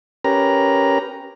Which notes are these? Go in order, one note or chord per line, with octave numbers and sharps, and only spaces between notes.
C#4 G4 A#4 B4 A#5